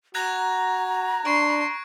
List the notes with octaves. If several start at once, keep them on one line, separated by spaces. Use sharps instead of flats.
F#4 A#5 F#6 G#6 A#6
D4 C6 C#6 D7